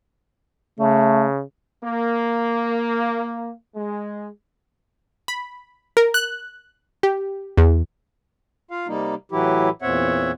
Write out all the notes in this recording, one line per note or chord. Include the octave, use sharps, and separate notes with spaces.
C#3 A3
A#3
G#3
B5
A#4
F#6
G4
E2
F4 F5
C3 G3 A#3 D#4
A2 E3 F#3 E4 G4
E2 A#2 C4 C#5 E5 F#5